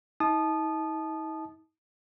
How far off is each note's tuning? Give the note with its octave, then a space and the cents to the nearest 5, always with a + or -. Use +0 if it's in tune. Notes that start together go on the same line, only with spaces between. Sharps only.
D#4 +45 A5 -20 D#6 -25